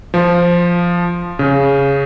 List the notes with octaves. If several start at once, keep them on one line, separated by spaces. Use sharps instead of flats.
F3
C#3